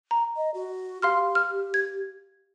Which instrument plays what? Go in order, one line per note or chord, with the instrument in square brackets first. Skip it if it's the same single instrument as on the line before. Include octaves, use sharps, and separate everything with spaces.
[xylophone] A#5
[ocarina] D#5
F#4
[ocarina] G4 [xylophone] F5 C6 F6
[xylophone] F6
G#6